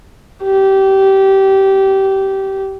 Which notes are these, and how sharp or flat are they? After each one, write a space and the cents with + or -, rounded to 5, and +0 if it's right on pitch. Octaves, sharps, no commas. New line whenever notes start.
G4 -20